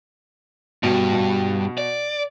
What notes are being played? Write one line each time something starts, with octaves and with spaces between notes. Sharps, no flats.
G2 B2
B2
D5